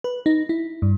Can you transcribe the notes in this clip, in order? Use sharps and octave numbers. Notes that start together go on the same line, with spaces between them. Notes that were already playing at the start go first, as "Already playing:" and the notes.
B4
D#4
E4
G2